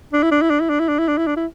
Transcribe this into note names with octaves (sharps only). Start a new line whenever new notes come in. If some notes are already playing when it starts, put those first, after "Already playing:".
D4
E4
D4
E4
D4
E4
D4
E4
D4
E4
D4
E4
D4
E4